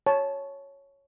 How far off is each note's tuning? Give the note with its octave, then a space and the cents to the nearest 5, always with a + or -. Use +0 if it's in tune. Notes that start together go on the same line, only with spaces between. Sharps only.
C#5 +0 A5 -15